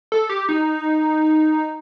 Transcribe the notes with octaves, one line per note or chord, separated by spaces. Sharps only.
A4
G4
D#4